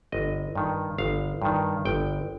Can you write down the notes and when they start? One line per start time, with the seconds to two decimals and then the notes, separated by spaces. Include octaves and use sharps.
0.12 G1 D#5
0.55 G2 D#3
0.98 G1 F5
1.42 G2 D#3
1.85 G1 G5